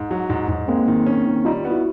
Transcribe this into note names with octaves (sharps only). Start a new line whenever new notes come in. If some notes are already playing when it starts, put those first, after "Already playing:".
Already playing: G#2
F#3
G#2
G#2
G#3 A#3 C4
D#3
C#4
D#3
G3 D#4 F4
B3
E4 F#4